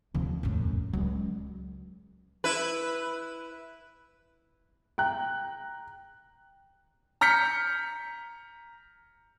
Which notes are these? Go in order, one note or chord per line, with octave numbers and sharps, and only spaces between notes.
D2 C3 F3 A#3
E1 A#1 F#2 A2 F#3
C#2 F#3 G#3
E4 B4
G5 A#5 F#6
A#5 F6 G6 B6 C#7